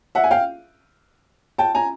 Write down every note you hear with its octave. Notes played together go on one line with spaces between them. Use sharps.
E5 F#5
G#5
F5 G5
G5 A5
G#5 A#5